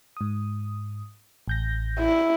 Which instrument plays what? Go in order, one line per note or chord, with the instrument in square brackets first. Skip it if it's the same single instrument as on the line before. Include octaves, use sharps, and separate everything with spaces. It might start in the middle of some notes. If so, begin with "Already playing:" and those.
[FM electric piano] G#2 D#6
A1 G6 A#6
[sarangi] E4